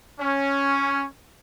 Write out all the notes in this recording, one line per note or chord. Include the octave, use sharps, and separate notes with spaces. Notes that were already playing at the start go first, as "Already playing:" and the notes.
C#4